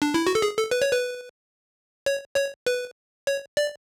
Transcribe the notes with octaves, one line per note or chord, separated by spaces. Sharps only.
D4
E4
F#4
A4
G#4
A4
B4
C#5
B4
C#5
C#5
B4
C#5
D5